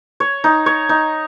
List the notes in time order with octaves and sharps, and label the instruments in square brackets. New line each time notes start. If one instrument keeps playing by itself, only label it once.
[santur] C#5
D#4
C#5
D#4